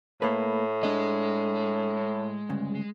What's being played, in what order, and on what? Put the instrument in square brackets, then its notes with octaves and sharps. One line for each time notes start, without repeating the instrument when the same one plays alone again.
[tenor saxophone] A2 [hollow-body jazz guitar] A3 A#3 B4
[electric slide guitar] G#3 [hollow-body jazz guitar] D4 D#5
[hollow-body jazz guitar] D2 G2 C#3